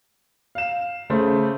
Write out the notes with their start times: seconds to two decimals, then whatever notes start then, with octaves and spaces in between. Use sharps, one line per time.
0.55 F5 E7
1.10 C#3 A3 C5